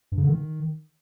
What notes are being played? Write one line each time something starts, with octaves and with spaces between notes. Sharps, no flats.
G2
C#3
D3
D#3